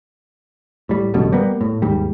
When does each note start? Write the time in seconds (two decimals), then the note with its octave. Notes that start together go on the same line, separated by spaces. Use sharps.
0.89 A2 G3
1.14 A1 F#2 B2 D3
1.32 G3 A#3 B3
1.61 A2
1.82 D#2 G#2 G3